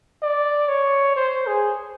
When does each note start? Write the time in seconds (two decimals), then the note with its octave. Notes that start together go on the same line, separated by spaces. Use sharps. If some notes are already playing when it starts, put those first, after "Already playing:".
0.23 D5
0.69 C#5
1.16 C5
1.47 G#4